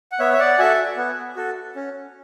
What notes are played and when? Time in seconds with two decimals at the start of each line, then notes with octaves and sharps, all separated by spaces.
0.12 F#5
0.19 B3 C#5 E5
0.33 E5
0.40 D5 F#5
0.58 F#4 A4 E5 G#5
0.97 B3
1.36 F#4 A4
1.76 C#4